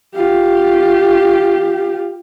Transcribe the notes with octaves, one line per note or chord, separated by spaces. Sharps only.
F4 G4